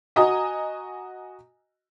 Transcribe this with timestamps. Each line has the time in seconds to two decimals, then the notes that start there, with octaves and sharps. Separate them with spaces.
0.16 F#4 D#5 G#5 A#5 D#6